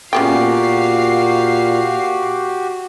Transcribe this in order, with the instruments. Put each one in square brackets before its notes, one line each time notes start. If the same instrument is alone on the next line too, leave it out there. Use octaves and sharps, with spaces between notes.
[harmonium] A#2 [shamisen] C#3 B3 G5 [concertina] F#4 G4 [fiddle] F5